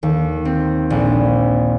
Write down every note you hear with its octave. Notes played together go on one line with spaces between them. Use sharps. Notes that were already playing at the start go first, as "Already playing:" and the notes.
D#2
C4
A#1